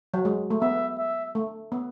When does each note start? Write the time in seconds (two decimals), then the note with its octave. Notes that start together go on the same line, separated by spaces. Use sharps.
0.14 F#3
0.25 G#3
0.50 A3
0.62 B3 E5
0.98 E5
1.35 A3
1.72 B3